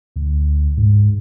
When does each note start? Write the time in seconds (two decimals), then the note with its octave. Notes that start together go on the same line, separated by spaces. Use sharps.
0.16 D2
0.77 G#2